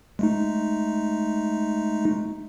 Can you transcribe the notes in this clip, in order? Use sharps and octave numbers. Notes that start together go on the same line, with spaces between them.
G#3 A3 D#4